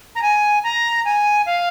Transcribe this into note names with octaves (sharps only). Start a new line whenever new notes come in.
A#5
G#5
A#5
G#5
F5